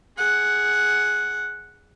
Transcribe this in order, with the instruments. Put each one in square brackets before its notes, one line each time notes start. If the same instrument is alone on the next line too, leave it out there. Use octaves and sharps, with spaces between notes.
[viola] G#4 F#5